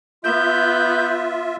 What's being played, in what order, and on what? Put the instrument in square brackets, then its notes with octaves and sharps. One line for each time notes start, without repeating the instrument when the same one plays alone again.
[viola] B3 [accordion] F4 E5 [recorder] G6